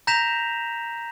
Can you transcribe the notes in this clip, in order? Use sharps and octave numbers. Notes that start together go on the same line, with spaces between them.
A#5 G6 A#6 B6 E7 F7